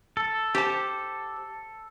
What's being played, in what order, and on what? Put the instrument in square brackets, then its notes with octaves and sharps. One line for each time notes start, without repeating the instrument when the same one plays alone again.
[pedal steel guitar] A4
[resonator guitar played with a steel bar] G4 C5 A5